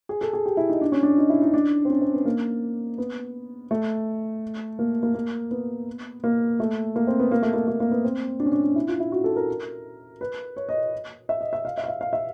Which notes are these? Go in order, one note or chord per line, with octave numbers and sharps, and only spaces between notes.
G#4
A4
G#4
G4
E4
D#4
D4
C#4
D4
D#4
E4
D#4
D4
C4
C#4
C4
B3
A#3
B3
A3
A#3
A#3
A#3
B3
A#3
A3
A#3
C4
B3
A#3
A3
A#3
A3
A#3
B3
C4
D4
C#4
D4
D4
E4
F4
E4
F#4
A4
A#4
B4
C#5
D#5
E5
D#5
E5
F5
E5
F5
E5
F5
E5